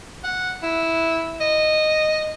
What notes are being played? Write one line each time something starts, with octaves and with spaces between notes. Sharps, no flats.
F#5
E4
D#5